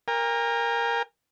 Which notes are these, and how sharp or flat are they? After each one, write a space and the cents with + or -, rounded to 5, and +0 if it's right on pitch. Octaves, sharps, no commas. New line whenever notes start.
A#4 +0 G#5 -45